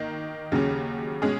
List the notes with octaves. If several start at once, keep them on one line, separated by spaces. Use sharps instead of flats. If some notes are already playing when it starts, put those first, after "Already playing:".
Already playing: D#3 A#3 D#4
D#2 C#3 F#3 C#4
B2 G#3 C#4 G#4